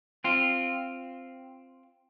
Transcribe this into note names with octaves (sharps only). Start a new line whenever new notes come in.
C4 F4